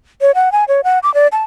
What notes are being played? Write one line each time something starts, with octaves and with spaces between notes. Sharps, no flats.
C#5
F#5
G#5
C#5
F#5
D6
D5
A5